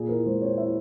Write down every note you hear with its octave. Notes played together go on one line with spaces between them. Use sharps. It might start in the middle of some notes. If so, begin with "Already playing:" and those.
Already playing: A#2 G#4
E4 A#4
G#3 C5
C4 C#5
E4 E5